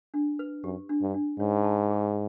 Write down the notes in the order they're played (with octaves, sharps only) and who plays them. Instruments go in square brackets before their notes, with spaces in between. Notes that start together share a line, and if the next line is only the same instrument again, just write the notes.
[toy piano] D4
B4
[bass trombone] F#2 [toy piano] G4
[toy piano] D4
[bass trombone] G2
[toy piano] D4
[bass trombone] G#2 [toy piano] C#5
[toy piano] A5
G#4